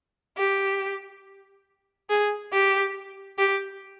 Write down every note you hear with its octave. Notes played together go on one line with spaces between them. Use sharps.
G4
G#4
G4
G4